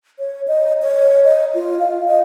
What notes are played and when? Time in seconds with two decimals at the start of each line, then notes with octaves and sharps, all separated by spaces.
0.19 C#5
0.48 D#5
0.82 C#5
1.24 D#5
1.54 F4
1.79 F5
2.08 D#5